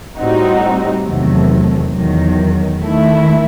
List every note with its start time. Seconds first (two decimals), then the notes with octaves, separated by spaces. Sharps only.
0.19 A2 G3 C4 D#4 F#4
1.06 E2 C3 D#3 F#3 A3
1.93 E2 D#3 F#3
2.81 D#3 A3 E4